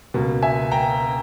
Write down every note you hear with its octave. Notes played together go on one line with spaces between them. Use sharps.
C#2 B2 A#3
E5 G#5
G5 A#5